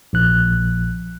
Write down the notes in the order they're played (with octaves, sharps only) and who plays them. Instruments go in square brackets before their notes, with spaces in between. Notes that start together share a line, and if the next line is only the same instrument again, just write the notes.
[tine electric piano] A#1 F#6